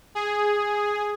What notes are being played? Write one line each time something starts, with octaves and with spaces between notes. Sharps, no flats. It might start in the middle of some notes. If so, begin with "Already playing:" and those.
G#4